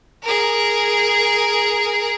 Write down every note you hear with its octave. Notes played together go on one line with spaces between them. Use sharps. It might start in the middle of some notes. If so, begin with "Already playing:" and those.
G#4 A#4